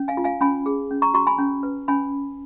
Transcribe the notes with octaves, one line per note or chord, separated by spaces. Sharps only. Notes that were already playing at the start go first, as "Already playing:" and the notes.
Already playing: C#4
F5 G#5
F4
F5 G#5
C#4 G#5 B5
G#4
C#4
A#5 C#6
F#4 A#5 C#6
G#5 B5
C#4
B4
C#4 G#5 B5